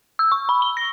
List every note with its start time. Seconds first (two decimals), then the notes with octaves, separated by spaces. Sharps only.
0.19 E6
0.32 C#6
0.49 B5
0.62 G7
0.77 A#6